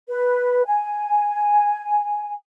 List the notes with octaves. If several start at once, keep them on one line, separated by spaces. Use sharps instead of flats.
B4
G#5